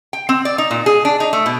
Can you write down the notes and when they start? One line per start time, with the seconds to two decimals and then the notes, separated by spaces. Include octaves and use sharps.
0.13 G5
0.29 C4
0.45 D5
0.58 D#4
0.71 A#2
0.86 G#4
1.05 D4
1.20 D#4
1.33 A3
1.46 B2